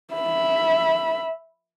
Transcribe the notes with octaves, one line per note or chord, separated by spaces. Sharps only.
E5 B5